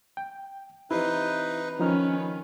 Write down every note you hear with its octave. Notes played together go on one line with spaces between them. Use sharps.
G5
C3 E3 D#4 E4 B4
D#3 F3 C#4 D#4 B4 F6